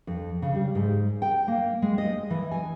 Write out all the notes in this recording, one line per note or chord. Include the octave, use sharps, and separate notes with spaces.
F2
C#3
G3
G#2
G5
A#3
G#3
D#5
E3
G#5